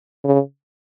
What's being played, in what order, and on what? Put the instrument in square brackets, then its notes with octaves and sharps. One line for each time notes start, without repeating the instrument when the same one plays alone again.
[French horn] C#3